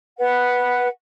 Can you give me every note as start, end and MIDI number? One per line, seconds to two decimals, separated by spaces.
0.17 0.87 71
0.17 0.87 78